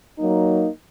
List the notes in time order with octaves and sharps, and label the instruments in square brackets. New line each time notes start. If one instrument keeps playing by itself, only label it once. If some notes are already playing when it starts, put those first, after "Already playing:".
[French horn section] F#3 A#3 D#4